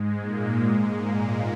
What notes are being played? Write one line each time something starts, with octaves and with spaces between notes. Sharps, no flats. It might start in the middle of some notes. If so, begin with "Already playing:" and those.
Already playing: G#2 G#3
A#2 A#3
G#2 G#3
A#2 A#3